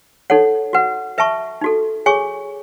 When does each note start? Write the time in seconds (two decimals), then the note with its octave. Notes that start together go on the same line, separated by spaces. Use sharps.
0.30 D#4 A4 C#5 F#5
0.73 F#4 B4 F#5
1.18 B4 E5 A5 C#6
1.61 D#4 F#4 A4
2.06 G#4 C#5 G#5 C#6